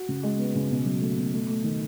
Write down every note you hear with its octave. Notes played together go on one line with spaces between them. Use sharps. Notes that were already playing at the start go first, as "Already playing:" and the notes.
Already playing: F#4
C#3
G#3
B3
C#3
B2
F#3
A3
B2
A3
A3
D#3